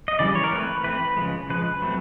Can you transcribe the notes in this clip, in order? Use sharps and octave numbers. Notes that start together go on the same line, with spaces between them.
D#5
C#3 E3 G3 D5
C#5
A#4
E3 A3 C4 B4
E3 A3 C4 B4
C#3 F3 G#3
C#3 F3 G#3 B4
F#3 A3 C4